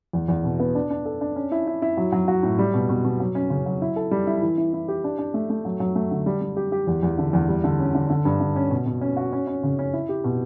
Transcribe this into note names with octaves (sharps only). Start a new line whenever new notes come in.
E2
E2
B2
B3
D4
D4
A4
D4
C#4
E4
E4
E4
F#3
F#3
F#4
A2
G3
B2
B2
B2
F#3
C#4
C#3
F#3
E4
A4
G3
E4
E3
E4
E4
G4
D4
D4
A3
A3
F#3
F#3
A3
D3
G3
G3
G4
G4
E2
E2
D3
E2
G3
D3
C#4
D3
D3
G2
D3
C#4
B2
B2
C#4
F#4
C#4
C#4
C#3
C#4
E4
G4
B2